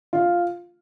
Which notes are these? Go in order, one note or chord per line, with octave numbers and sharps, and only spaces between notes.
F4